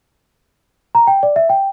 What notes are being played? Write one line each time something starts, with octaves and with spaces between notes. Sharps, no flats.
A#5
G5
D5
E5
G5